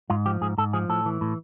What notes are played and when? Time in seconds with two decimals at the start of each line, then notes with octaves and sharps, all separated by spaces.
0.10 G#2 F4
0.26 F3 G4
0.41 G#2 G#4
0.58 G#2 A4
0.73 F3 G#4
0.89 A2 A4
1.06 E3
1.21 A2